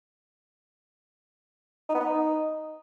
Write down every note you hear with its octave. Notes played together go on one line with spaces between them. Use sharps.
D#4
B3
D#4